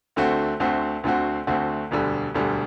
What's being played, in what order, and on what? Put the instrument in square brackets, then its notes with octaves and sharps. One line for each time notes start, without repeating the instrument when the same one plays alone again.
[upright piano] D2 D3 A3 C4 F#4
D2 D3 A3 C4 F#4
D2 D3 A3 C4 F#4
D2 D3 A3 C4 F#4
E1 D2 D3 G3
E1 D2 D3 G3